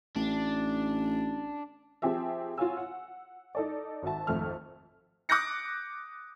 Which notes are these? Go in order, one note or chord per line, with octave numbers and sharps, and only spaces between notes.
A1 D4
F3 C4 G4 G#4 E5
F4 F#4 C#5 F5 G#5 E6
F#5
D#4 A4 D5
G#1 F#4 E5 A5
G#1 F2 A3 F6
D6 D#6 F#6 G6 A#6 C#7